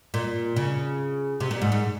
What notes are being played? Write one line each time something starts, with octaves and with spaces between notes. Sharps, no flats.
A#2
C#3
C3
A#2
G#2
G#2